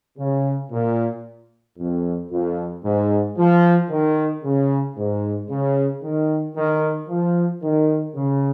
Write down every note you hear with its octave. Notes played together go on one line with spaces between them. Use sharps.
C#3
A#2
F2
F2
G#2
F3
D#3
C#3
G#2
C#3
D#3
D#3
F3
D#3
C#3